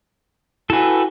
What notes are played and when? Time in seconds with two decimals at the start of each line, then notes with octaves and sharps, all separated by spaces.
0.70 E4 F#4 A4 B4 G#5